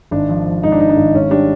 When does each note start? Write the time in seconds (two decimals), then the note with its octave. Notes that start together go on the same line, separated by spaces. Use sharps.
0.11 G#1 D4
0.29 F3
0.46 F3
0.63 G#2 D#4
0.72 D4
0.80 G#2 D#4
0.89 D4
0.97 G#1
1.14 G#2 C#4
1.31 G3 D4